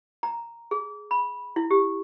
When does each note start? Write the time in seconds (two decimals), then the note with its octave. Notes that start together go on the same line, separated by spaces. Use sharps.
0.23 A#5
0.71 G#4
1.11 B5
1.56 E4
1.71 G4